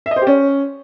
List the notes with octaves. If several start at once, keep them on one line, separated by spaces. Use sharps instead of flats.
E5
D#5
C5
G4
C#4